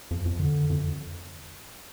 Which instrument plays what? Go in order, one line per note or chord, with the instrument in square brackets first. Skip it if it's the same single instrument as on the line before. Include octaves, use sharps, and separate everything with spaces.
[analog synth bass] F2
F2
D3
F2